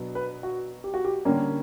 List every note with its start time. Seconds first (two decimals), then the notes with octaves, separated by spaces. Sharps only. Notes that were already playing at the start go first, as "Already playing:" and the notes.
Already playing: B2 F#3 B3 D4
0.15 B4
0.43 F#4
0.84 G4
0.94 F#4
1.05 G4
1.25 D3 G3 A#3 C#4